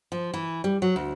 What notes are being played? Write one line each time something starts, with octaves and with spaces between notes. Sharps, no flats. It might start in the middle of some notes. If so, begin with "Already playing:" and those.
F3
E3
G3
F#3
D2